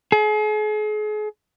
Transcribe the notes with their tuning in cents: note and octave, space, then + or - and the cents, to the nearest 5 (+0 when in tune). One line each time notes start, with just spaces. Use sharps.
G#4 +40